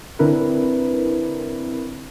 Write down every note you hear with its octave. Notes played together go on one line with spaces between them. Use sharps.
D3 C4 D4 E4 A#4 B4